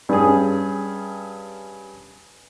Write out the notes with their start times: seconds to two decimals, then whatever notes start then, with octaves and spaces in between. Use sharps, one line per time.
0.09 G2 C#4 G#4